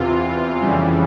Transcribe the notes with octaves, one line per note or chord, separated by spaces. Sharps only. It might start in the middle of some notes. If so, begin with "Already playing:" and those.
Already playing: E2 C3 E3 F4
F2 C#3 E3 G3